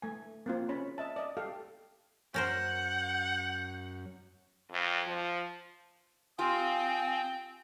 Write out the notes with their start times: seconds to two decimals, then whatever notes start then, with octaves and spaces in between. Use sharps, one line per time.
0.02 A3 G#5
0.46 A#3 C4 F4
0.69 C#4 C#5 B5
0.98 D#5 E5 A5
1.16 D5 D#5
1.37 G4 A4 F5
2.34 F#2 C#4 A#4 C5 F#5 G6
4.71 F2
5.06 F3
6.39 C4 F4 G4 F5 G5 G#5 D#6